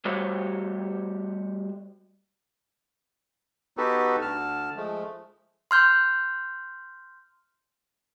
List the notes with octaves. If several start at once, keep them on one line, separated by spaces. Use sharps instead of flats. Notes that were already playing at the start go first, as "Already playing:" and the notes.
G3 A3 F#4 G4 C5 C#5
B3 D#4 F#4 G4 A4 B4
D2 D3 A5 F6
F3 G#3 A3
C6 F6 G6